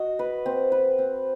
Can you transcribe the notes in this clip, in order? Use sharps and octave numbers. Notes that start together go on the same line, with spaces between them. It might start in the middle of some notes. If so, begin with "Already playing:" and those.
Already playing: F#4 D#5
B4
C4
B4
C4